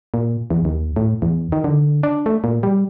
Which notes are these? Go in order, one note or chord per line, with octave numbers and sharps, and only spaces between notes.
A#2
E2
D#2
A2
E2
D#3
D3
D4
A3
A#2
G3